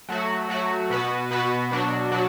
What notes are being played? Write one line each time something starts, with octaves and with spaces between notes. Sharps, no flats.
F#3 A3 F#4
F#3 A3 F#4
B2 B3 F#4 B4
B2 B3 F#4 B4
B2 F#3 D4 F#4
B2 F#3 D4 F#4